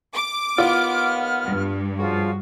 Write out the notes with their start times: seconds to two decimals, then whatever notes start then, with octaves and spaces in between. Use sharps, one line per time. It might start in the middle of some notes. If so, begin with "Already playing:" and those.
0.13 D6
0.58 D#2 B3 F4 F#5 F6
1.44 G2
1.99 C#3 F3 F4 F#4